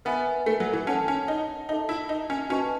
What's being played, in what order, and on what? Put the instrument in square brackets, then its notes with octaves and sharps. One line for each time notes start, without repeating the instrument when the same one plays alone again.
[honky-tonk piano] B3 [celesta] B4 E5 G#5 B5
[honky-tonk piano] A3
F#3
E3
[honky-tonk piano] C#4 [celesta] A4 C#5 F#5 A5
[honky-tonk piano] C#4
D#4
[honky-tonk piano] D#4 [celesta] A4 E5 A5
[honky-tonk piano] E4
D#4
C#4
[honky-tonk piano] C#4 [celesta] F#4 B4 D#5 A5 C#6